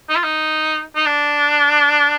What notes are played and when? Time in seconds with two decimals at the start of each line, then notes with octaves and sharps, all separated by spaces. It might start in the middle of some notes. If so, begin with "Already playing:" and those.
0.09 D#4
0.16 F4
0.24 D#4
0.95 D#4
1.06 D4